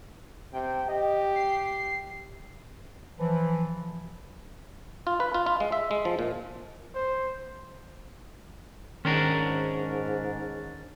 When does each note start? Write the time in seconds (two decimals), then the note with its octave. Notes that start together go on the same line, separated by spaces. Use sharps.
0.53 C3 G5
0.88 G4 D#5
1.36 C7
3.18 E3 F3
5.07 F4
5.20 B4
5.34 F4
5.46 F4
5.60 G#3
5.72 E5
5.91 G#3
6.05 F3
6.19 A#2
6.95 C5
9.05 G#2 D#3 C#4 D4 A#4